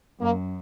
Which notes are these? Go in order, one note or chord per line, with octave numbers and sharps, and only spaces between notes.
F#2 A#3